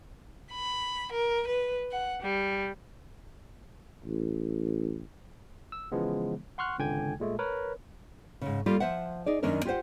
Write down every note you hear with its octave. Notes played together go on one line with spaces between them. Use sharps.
B5
A#4
B4
F#5
G3
A1
E6
C#3 E3 F3 G#3 B3
F#5 C6 C#6 F6 F#6
G#1 C#2 D3 G5 G#5 G#6
A#2 G#3 A3
A#4 B4 C#5
G#2 C#3
G3 A#3 F4 G4 A4
F3 C5 E5 F#5
D#4 G#4 D5
F#2 D#3 A#3 C#4 D4 A#4
F4 G4 G#4 C5 F#5